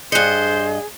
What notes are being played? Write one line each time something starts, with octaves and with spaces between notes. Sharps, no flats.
G2 G#4 C5 D#5 F#6 C#7